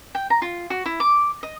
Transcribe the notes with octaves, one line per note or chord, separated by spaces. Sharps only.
G5
A#5
F4
F#4
E4
D6
D#5